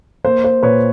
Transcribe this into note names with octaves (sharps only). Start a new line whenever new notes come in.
A#3 C5
C5
A#2 B4 C#5